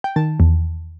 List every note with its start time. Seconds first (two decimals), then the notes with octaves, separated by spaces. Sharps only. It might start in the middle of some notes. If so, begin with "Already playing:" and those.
0.04 G5
0.16 D#3 A5
0.40 E2